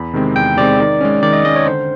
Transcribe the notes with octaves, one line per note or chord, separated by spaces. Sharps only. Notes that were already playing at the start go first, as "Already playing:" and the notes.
Already playing: E2 B5
C3 D#3 G#3 C4
E2 G5
C3 D#3 G#3 C4 D5
D#3
G#3 C#4
D#3 D5
D#5
G#3 C#4 D#5
C#5
D3 C5